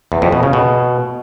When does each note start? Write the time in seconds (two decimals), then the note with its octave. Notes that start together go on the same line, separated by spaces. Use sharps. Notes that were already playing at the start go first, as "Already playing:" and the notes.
0.12 E2
0.22 F2
0.32 B2
0.43 C#3
0.53 B2